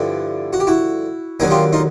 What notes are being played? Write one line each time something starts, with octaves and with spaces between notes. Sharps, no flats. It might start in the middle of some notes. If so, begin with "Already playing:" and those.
Already playing: G2 D3 F3 A3 D4 E4
F#4
G4
E4 F#4
D#2 D3 F#3 A#3 G#4 A#4
F4 G4
D#4 F4